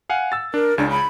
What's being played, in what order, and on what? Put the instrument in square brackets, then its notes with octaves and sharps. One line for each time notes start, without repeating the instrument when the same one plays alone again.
[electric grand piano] F5 F#5 G#5
E6 A6
[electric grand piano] D4 [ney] A#4
[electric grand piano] C#2 C#3 [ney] D4
[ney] B5